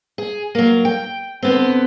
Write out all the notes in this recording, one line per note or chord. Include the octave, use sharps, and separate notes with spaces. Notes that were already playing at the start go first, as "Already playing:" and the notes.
G#4
F#3 A#3
G5
D3 B3 C4